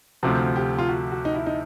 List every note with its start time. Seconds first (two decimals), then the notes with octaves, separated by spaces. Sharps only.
0.23 D2 C3 F3 F#4
0.56 G4
0.78 F4
0.89 F#4
1.12 F#4
1.25 D#4
1.35 E4
1.46 D#4